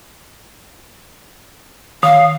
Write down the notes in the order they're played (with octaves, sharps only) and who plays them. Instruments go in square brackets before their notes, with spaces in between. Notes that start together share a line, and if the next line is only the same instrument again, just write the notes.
[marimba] D#3 [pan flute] F5